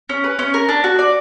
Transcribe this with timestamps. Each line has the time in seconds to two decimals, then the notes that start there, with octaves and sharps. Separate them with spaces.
0.09 C#4
0.24 B4
0.39 C#4
0.54 A#4
0.69 D4
0.84 F#4
0.99 D5